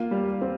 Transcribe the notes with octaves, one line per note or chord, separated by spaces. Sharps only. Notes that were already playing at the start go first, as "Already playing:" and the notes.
Already playing: A#3 F4
G3
C4